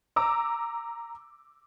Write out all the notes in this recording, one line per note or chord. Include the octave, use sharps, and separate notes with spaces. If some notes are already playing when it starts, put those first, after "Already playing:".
A#5 D6 E6